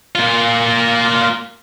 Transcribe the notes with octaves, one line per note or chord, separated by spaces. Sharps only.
A#3 F4